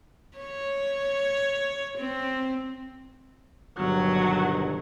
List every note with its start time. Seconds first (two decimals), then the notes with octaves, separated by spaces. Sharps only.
0.38 C#5
1.98 C4
3.78 G1 B2 D#3 F#3